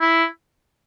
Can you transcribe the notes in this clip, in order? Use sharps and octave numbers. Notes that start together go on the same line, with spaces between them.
E4